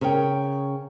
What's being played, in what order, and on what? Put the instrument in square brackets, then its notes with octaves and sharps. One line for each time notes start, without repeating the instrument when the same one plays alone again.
[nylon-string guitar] C#3 A#4 C#5 F5 G5